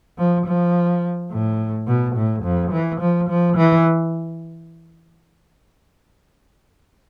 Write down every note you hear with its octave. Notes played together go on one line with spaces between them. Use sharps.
F3
F3
A2
B2
A2
F2
E3
F3
F3
E3